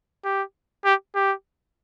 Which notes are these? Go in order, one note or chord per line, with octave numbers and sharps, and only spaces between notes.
G4
G4
G4